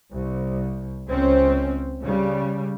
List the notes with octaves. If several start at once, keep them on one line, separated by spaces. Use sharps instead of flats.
C2
C#2 C4 C#4
C#3 G3